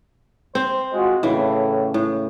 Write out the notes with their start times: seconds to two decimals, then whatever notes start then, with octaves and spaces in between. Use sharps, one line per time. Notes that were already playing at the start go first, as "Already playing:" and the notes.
0.55 C4 C5
0.93 G#3 F4 F#4
1.23 A2 C#3 E3
1.94 A2